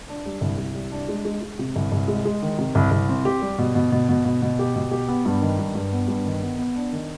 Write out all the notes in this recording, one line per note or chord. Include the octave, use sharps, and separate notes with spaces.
D4
G3
C2
C2
G3
D4
G#3
G#3
G#3
C3
C2
C2
G#3
G#3
D#3
C3
C2
C2
C4
G4
G3
B2
B2
B2
B2
B2
B2
G4
B2
G4
B3
G2
D#3
G2
G2
B3
G2
D#3
B3
B3
D4
D#3